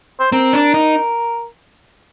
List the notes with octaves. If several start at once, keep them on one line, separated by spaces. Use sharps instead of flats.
C5
C4 A#4
D4
D#4